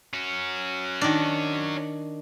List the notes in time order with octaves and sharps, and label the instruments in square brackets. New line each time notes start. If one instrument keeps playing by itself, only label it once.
[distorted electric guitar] C#4 F#4
[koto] D#3 D4